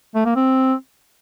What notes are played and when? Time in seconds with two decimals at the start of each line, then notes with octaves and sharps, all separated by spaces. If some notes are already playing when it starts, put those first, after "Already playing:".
0.15 A3
0.26 A#3
0.36 C4